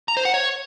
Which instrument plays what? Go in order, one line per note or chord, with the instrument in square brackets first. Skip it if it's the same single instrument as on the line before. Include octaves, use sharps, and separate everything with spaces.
[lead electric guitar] A#5
C5
F#5
C#5